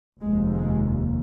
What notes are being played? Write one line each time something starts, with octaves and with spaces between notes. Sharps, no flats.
F1 D#2 G#3
G#3